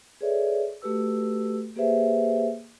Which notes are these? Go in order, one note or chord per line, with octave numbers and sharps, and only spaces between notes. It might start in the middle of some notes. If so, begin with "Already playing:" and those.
G#4 A4 B4 C#5 D5 E5
A3 F#4 G4 A4 B4 E6
A#3 G4 G#4 B4 C5 E5